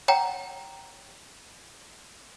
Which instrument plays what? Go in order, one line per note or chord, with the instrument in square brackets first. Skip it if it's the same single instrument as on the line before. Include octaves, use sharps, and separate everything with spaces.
[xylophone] C#5 F#5 G5 A#5